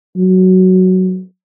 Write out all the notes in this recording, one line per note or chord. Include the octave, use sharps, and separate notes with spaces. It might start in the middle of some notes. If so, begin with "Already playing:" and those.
F#3